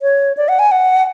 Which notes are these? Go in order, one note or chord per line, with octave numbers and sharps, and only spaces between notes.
C#5
D5
F#5
G#5
F#5